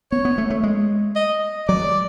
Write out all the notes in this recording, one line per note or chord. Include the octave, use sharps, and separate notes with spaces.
B3 C#5
B3
A3
A3
G#3
D#5
F#3 D5